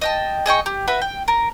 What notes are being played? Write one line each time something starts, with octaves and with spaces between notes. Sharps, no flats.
D#5 G5 A5
G#4 D#5 G5 C#6
G4
F#4 B4 E5 B5
G5
A#4